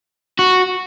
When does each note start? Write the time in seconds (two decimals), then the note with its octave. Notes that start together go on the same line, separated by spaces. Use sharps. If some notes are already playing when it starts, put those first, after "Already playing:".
0.39 F#4